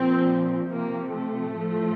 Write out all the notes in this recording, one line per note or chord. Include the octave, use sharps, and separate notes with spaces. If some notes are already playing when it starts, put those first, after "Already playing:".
Already playing: A#2 F3 C4
C3 F3 A#3
A3
A2 F3